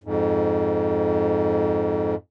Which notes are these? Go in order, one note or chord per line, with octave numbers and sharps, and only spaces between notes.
F2 G#2